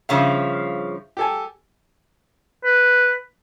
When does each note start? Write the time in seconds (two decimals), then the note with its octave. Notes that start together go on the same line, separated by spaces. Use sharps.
0.09 G2 C#3 F3 E5 F5
1.17 G4 A4 G#5
2.65 B4